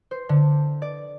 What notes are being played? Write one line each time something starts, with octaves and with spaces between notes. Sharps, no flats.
C5
D3
D5